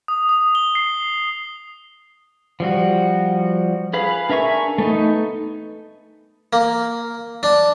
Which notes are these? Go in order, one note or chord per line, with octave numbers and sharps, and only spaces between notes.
D#6
D#6
G7
C7
F3 G3 F#4
G#4 B4 F5 B5
D4 A#4 E5 G#5 C#6
A3 B3 D#4
A#3
D4